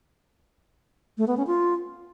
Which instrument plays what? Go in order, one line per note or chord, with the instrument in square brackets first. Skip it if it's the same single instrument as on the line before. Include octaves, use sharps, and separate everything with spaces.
[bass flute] A3
B3
C#4
F4